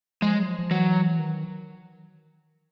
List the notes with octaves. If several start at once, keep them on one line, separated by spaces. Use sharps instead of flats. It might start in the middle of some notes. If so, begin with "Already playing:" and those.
F3 G#3
F#3
F3
F3
E3 F#3
D#3